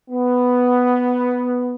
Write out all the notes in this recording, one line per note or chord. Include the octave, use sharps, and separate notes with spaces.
B3